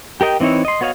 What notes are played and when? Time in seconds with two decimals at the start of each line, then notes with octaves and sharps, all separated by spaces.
0.21 G4 A#4 D#5 G5
0.40 E3 C4 D#4 E4 C#5
0.65 D#5 C6
0.81 B3 F#4 C#5 D#5 F5